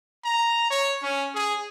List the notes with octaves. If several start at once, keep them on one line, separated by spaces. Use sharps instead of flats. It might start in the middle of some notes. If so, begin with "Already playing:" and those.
A#5
C#5
C#4
G#4